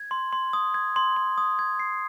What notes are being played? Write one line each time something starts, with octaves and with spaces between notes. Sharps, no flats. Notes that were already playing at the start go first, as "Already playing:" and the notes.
Already playing: G#6
C6
C6
D#6
G#6
C6
C6
D#6
G#6
C7